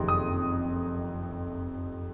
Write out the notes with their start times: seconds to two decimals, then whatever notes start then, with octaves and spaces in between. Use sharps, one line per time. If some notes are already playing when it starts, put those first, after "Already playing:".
Already playing: F#1 F2 C3 D#3
0.08 D#6